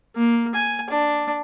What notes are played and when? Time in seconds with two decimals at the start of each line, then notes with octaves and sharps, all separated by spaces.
0.16 A#3
0.55 G#5
0.90 D4